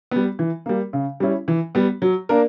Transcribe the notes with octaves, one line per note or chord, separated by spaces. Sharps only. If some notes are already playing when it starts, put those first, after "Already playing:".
G3 B3
E3
G3 A#3
C#3
G3 C#4 E4
E3
G3 B3
F#3
A#3 D4 A#4